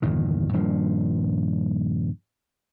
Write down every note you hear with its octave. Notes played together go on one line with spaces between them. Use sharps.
G1 E2 A#2 D#3
D#1 G2 F3